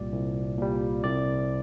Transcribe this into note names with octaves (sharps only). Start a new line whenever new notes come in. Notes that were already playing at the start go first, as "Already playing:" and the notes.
Already playing: C2 A#2 G3 D5
C2
A#2 G3
C2 D5